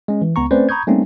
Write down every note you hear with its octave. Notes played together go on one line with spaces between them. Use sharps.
G#3 C#4
E3
C#2 B3 A#5 C#6
A3 C4 C#4 B4 C5 D5
A#5 B5 C#6 D#6 G6 G#6
G3 A3 A#3 C4 C#4 D#4